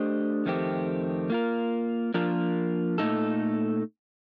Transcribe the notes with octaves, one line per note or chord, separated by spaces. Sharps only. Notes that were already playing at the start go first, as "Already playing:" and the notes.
Already playing: A3 D4 G4 C5 D#5
F2 D#3 A3 C4 G4
A#3 F4 A#4
F3 A#3 D4 F4 A#4
A#2 A3 D#4 A4